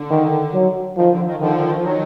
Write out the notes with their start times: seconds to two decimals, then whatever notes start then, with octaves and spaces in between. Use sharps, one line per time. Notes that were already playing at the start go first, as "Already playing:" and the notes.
Already playing: D3
0.10 D#3
0.53 F#3
0.96 D#3 F3
1.11 D3
1.26 D#3
1.40 D3 D#3 F3
1.68 D#3
1.76 F3
1.83 D#3 F#3